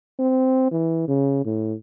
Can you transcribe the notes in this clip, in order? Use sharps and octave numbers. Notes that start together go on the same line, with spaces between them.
C4
E3
C#3
A2